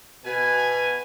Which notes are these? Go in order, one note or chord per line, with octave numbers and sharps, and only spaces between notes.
B2 B4 G#5